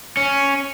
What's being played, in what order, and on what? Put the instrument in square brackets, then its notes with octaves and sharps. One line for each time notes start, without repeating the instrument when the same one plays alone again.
[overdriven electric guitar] C#4